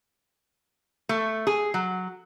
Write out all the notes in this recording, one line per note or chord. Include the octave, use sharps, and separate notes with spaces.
A3
G#4
F#3